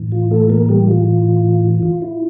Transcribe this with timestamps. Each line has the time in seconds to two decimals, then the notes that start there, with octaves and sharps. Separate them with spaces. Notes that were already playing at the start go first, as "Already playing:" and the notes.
Already playing: A2 E3
0.12 F4
0.31 A3 A4
0.50 A#3 A#4
0.69 G3 G4
0.88 F4
1.83 F4
2.02 E4